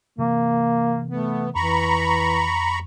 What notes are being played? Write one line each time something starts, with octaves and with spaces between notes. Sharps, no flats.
C3 E3 A#3
A3 B3
F2 E3 A#5 B5 C#6